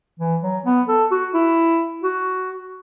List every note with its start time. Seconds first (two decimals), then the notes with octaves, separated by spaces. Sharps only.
0.20 E3
0.43 F#3
0.66 B3
0.88 A4
1.11 F#4
1.34 E4
2.03 F#4